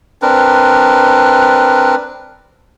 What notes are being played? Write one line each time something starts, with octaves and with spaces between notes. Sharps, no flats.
C4 D4 A#4 B4